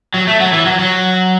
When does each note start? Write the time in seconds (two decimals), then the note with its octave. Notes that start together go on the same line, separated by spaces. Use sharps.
0.14 F#3
0.27 A3
0.40 F#3
0.53 E3
0.66 F#3
0.79 F#3